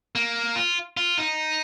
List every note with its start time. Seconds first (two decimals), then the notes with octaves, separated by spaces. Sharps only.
0.15 A#3
0.56 F4
0.97 F4
1.18 D#4